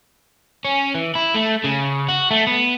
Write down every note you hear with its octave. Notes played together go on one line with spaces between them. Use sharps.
C#4
E3
E4
A3
C#3
F#4
A3
B3